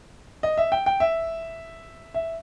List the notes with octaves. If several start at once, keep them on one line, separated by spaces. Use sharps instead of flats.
D#5
E5
G5
G5
E5
E5